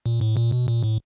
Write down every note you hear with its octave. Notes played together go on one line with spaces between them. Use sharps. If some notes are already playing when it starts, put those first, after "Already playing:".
A#2
A2
A#2
B2
A#2
A2